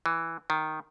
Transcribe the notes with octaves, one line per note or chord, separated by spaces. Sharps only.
E3
D#3